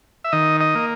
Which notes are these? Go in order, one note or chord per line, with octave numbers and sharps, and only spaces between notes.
E5
D#3 D#5
D#5
A#3